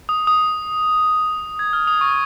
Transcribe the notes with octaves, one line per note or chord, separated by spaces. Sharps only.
D#6
D#6
G#6
F6
D#6
C#6